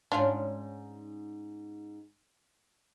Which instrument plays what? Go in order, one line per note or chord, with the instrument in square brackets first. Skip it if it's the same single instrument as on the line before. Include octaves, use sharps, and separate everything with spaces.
[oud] G#2 C#4 [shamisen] D4 F4